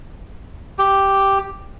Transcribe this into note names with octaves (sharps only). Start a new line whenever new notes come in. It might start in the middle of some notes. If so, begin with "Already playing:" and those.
G4